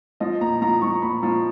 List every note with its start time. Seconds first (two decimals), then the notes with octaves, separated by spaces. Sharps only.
0.20 F3 D#5
0.41 A#2 A#5
0.62 F3 A#5
0.81 F3 C#6
1.02 A#2 B5
1.23 F3